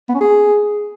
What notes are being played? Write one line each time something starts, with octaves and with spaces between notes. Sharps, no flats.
B3
C#4
G#4